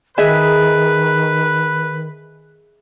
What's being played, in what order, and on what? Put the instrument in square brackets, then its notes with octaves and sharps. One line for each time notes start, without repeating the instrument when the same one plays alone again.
[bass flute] D#3 [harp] G#4 D#5 E5 [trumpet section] B4